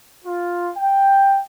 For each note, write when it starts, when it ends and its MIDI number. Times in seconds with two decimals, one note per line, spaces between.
0.25 0.69 65
0.75 1.39 79